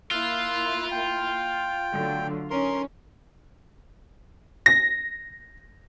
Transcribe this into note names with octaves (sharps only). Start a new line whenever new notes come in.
A#3 E4 F4 E6 F#6
G5
D3 F#3 A3
C#4 D#4 A#4 C6
A#6